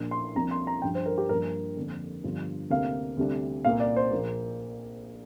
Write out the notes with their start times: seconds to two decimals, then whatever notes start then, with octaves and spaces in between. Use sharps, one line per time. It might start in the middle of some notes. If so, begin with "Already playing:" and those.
Already playing: A#1 A#2 A#3 D4
0.11 C6
0.35 C2 C3 F3 A#3 D4 A#5
0.51 C6
0.67 A#5
0.82 G2 F3 D4 G5
0.95 C5
1.06 A#4
1.18 G4
1.29 G2 F3 A#3 D4 A#4
1.77 F2 D3 A#3 D4
2.24 G1 G2 F3
2.70 D2 C3 A#3 D4 F5
3.17 D2 C3 G3 D4
3.65 C2 A#2 A#3 F5
3.80 D5
3.96 C5
4.11 A#1 A#2 A#3